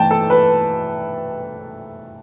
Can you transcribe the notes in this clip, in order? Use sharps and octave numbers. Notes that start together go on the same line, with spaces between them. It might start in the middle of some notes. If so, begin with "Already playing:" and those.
Already playing: E3 A3 E4 G5 A5
A4
B4